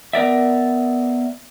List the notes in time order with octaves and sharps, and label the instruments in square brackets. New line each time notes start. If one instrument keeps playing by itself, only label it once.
[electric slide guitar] B3 A#4 D5 E5